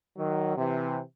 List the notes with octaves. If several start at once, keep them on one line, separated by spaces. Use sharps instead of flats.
D#3 F#3
C3 E3